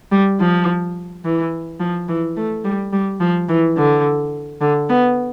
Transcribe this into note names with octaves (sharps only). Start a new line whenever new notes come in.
G3
F3
E3
F3
E3
A3
G3
G3
F3
E3
D3
D3
B3